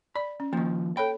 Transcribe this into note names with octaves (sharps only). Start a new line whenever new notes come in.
D5 B5
C#4
D#3 F3 A#3
A4 C#5 G5 B5